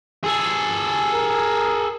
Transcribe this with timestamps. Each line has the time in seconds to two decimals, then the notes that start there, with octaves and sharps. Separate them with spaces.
0.24 G#4 A4
1.13 A#4